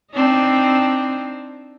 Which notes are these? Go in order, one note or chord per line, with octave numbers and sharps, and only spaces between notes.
C4 D4 D#4